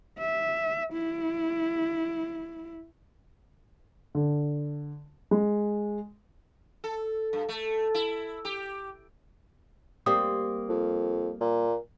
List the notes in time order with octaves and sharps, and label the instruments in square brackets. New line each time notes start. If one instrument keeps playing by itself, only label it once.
[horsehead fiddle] E5
E4
[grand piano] D3
G#3
[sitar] A4
G2
A3
E4
G4
[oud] G3 A#3 C4 [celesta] D#6
[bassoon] F2
A#2